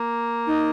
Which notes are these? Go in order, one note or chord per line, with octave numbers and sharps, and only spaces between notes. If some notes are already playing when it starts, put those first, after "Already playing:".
Already playing: A#3
D#4